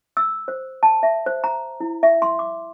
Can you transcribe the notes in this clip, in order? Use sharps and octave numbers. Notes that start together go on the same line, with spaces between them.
E6
C5
A5
E5
C5
A#5
E4
E5
C6
D6